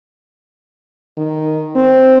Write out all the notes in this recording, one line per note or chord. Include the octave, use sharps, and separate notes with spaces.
D#3
C4